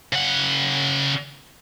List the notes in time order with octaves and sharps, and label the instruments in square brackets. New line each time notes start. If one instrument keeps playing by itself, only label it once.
[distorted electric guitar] C#3 F#5